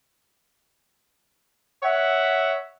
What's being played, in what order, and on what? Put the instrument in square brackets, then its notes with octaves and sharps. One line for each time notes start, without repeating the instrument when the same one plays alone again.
[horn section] C#5 E5 F#5